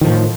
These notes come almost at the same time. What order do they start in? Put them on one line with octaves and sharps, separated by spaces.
D#3 F3 A2